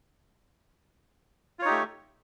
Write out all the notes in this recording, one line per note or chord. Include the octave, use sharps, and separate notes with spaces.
A3 D#4 F4 G4 C#5